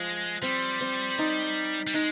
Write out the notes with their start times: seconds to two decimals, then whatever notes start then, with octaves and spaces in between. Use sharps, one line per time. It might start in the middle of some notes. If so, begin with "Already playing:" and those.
Already playing: F3 G#3
0.43 G3 C4
0.81 C4
1.19 D#4
1.87 G3
1.94 G#3 D#4